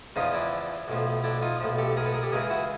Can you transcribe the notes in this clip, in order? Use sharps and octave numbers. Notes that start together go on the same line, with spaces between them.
E2 C#3 F3 D#4 F4
D4 E4
B1 A2 F3
D4 E4
D#4 F4
B1 A2 F3
G4 A4
G#4 A#4
A4 B4
G#4 A#4
G4 A4
C#2 C#3 E3 G#4 A#4
E4 F#4